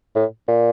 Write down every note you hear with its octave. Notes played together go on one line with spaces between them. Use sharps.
A2
A#2